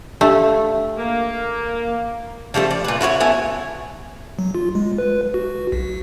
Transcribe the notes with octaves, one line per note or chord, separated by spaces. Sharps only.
A3 D4 G4 F5
A#3
F3 G3 A3 A4
D5
A#2 B4
E4 F#4 A4 C#5
A3 B3 E4 G#5
F#3
F4
G#3
B4
F#4
B1